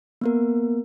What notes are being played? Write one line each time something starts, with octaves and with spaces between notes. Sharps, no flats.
A#3 B3 A#4